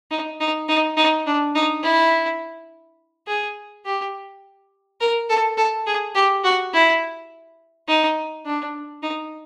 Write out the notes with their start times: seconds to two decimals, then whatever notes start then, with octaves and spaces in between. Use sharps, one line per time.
0.11 D#4
0.40 D#4
0.69 D#4
0.97 D#4
1.27 D4
1.55 D#4
1.84 E4
3.28 G#4
3.85 G4
5.01 A#4
5.29 A4
5.57 A4
5.87 G#4
6.15 G4
6.44 F#4
6.74 E4
7.88 D#4
8.46 D4
9.03 D#4